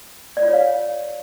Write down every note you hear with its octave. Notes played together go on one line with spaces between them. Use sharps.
D5
F4
C#5
F5